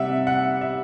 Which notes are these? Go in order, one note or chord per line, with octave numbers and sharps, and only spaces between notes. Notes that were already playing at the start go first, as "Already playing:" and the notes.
Already playing: C3 G3 E5 F#5
F#5
E5